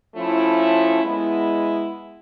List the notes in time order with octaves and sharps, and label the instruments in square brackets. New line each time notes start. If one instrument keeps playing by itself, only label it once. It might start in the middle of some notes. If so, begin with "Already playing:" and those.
[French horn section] F3 A3 C#4 E4
G#3 B3 E4